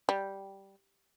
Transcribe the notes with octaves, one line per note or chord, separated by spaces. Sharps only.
G3